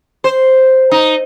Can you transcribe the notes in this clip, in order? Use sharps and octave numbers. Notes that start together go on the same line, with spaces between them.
C5
D#4